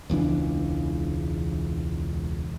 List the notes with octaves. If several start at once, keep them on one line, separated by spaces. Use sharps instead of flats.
E1 C#2 E3 D4